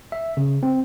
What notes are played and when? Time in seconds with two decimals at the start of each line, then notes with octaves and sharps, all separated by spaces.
0.12 E5
0.37 C#3
0.63 C4